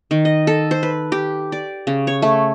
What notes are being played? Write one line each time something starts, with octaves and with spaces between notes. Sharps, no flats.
D#3
D#5
A4
C5
B4
G4
D5
C#3
C#5
A3